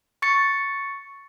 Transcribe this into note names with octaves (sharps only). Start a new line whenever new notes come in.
C#6 A6 C#7